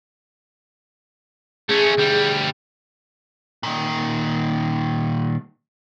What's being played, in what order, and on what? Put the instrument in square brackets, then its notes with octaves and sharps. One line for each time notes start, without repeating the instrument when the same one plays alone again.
[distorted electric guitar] A3 C#4 [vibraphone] G#4
[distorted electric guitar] D2 G3
[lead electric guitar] A#2 D#3